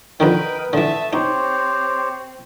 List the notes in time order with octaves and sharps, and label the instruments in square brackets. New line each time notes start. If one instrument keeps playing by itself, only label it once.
[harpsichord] F2 D3 D#3 [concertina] A#4 D#5 G5 [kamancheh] B4
[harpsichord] D3 E3 [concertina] A3 D#6 [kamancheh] E5 A5
[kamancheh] C4 [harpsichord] D#4 [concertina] G4 C5 C#5